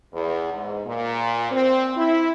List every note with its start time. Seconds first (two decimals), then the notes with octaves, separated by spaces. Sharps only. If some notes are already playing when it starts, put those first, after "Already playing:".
0.14 E2
0.53 G#2
0.86 A#2
1.51 C4
1.96 E4